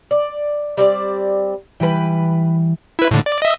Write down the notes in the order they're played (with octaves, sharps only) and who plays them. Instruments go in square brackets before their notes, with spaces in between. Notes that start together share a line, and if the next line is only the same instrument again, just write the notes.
[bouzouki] D5
G3 C4 D5
[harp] E3 G3 [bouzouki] B4 G5
[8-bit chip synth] E4 B4
A2 D3
D5
D#5 E5